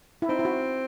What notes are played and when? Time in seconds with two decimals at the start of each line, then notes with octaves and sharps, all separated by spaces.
0.22 E4
0.29 C4 D#4
0.39 E4
0.45 F#4